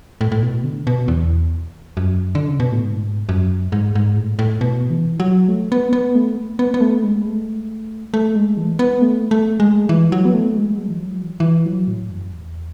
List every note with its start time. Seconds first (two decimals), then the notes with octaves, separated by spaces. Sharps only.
0.21 A2
0.32 A2
0.42 B2
0.64 D3
0.87 B2
1.08 E2
1.97 F#2
2.35 D3
2.48 C#3
2.60 B2
2.72 A2
2.84 G#2
3.29 F#2
3.72 G#2
3.95 G#2
4.17 A2
4.39 A2
4.61 B2
4.90 E3
5.20 F#3
5.48 A3
5.72 B3
5.93 B3
6.15 A3
6.59 B3
6.74 B3
6.81 A3
7.03 G#3
7.25 A3
8.14 A3
8.35 G#3
8.57 E3
8.79 B3
9.02 A3
9.31 A3
9.60 G#3
9.89 E3
10.12 F#3
10.25 B3
10.34 A3
10.56 G#3
10.78 F#3
10.88 E3
10.99 F#3
11.22 E3
11.31 F#3
11.40 E3
11.66 F#3
11.87 A2
12.09 F#2
12.32 E2